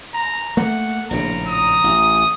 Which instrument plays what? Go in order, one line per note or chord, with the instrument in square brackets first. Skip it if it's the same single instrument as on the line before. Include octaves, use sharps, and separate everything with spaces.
[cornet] A#5
[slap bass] A3 A#3 [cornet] F#5
[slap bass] A#1 A2 C#3 [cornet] A#5
[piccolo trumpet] D#6
[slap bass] A1